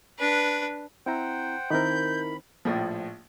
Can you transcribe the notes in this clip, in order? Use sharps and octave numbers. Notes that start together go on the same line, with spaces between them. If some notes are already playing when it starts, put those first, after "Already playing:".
D4 B4
C4 E4 C5 F#5 G5 A#5
D#3 C4 D#4 E4 A#4 B5 G6
A#1 A2 F3